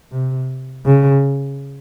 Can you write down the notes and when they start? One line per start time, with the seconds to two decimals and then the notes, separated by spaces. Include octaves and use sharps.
0.12 C3
0.86 C#3